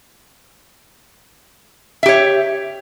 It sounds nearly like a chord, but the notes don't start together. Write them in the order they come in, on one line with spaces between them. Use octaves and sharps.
E5 G4 C#5